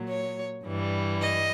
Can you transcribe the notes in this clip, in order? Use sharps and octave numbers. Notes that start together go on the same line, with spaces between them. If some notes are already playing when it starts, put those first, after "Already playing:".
Already playing: A#2 F#3
C#5
G2 E3 G3
D#5